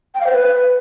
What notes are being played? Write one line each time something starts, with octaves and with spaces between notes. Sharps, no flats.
G5
F5
C5
B4